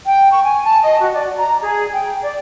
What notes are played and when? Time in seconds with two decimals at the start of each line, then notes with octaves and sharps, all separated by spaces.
0.05 G5
0.31 C#6
0.44 G#5
0.64 A5
0.82 D#5
1.01 F#4
1.13 D5
1.37 A#5
1.62 G#4
1.93 G5
2.23 D5